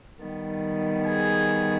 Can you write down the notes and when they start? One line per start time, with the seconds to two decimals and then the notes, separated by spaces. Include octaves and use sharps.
0.21 D#3 G3 B3
1.07 G#4